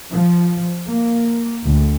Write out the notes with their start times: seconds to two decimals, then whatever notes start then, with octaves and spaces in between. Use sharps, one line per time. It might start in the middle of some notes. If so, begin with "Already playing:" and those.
0.10 F3
0.87 A#3
1.65 D2